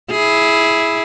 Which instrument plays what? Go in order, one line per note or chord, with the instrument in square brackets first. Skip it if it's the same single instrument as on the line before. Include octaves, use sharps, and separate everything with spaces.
[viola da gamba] E4 G#4